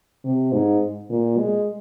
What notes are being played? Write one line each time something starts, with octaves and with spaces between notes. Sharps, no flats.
C3
G#2
A#2
G#3